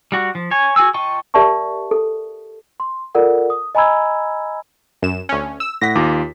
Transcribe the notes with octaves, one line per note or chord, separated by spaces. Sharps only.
G3 F#4
F3
C#5 G#5
F#4 G#4 G#5 E6
F4 D#5 G5 A5 C#6
G4 A#4 D5 E5 A5 C#6
A4
C6
F4 A4 A#4 D5 F#5
D#6
D#5 G#5 A#5 B5 E6 G#6
F#2 E7
D2 C#4
E6 E7
A2 F#5 A#6 B6
D#2 F4 D6